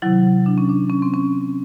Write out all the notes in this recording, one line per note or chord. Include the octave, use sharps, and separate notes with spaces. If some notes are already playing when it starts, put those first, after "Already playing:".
C3 D#3 F#3 E4
D4
C#4
D4
C#4
C4
C#4